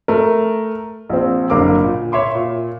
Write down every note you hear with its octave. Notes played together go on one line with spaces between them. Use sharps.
A3 A#4
A#1 C4
F#1 D3 A#4 F5 D6
A#2
C#5 E5 C6 D6
A#2